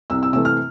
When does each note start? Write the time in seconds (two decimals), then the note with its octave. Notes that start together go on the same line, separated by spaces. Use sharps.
0.10 C2 E6
0.23 E6
0.33 C3 E3 A3 E6
0.45 F6